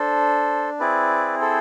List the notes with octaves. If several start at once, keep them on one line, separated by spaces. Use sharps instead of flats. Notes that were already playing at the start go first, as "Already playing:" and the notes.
Already playing: D4 A4 C5
C4 E4 G#4 B4 D5
A4 C5